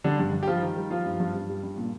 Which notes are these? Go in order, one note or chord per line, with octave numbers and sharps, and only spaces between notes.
D3 G3 D4
G2
G2
G4
F3 G3 F4
D#3
G3
F3 G3 F4
G2
G2
G2
G3
G2
A#2